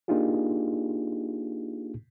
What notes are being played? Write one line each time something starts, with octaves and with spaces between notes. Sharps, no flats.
A#3 D4 D#4 F4 G4 G#4